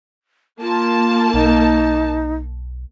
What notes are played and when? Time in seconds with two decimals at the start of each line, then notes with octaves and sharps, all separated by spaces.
0.61 A#3 F4 A5
1.34 B1 D#4